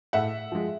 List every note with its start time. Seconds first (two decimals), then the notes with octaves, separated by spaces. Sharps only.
0.13 A2 E5 F#5
0.52 F3 G#3